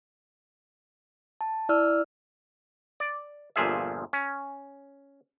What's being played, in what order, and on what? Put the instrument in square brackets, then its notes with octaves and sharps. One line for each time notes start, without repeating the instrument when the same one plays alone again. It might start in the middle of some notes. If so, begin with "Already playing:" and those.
[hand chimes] A5
E4 D5 E6 F6
[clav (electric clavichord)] D5
G1 A#2 F3 G#4 E5
C#4